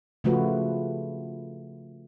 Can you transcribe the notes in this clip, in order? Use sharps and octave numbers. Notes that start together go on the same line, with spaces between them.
C#3 F3 A3 F4 F#4 B4